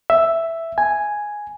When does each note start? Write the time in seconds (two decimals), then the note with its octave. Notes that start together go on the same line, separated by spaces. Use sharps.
0.10 E5
0.78 G#5